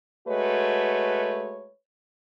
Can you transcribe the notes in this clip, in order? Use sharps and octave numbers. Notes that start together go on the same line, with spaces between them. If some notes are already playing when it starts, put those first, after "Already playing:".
G#3 A3 F#4 B4 C#5